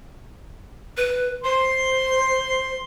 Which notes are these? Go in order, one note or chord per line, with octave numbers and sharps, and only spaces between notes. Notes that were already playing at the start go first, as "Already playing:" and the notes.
B4
C5 C6